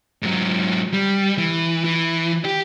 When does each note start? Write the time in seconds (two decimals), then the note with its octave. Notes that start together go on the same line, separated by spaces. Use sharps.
0.22 G#2 F#3
0.93 G3
1.38 E3
1.84 E3
2.45 G4